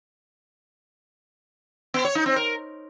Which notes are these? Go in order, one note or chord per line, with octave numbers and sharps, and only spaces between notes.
B3
C#5
D#4
C4
A#4